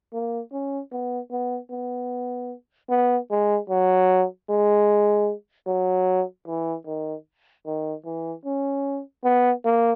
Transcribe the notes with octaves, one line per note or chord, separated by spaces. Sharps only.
A#3
C#4
B3
B3
B3
B3
G#3
F#3
G#3
F#3
E3
D#3
D#3
E3
C#4
B3
A#3